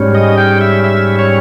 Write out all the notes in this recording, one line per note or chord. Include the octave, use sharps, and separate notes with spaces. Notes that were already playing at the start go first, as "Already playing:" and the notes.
Already playing: G#2 G3 C#4
D#5
G5
E5
E5
C#5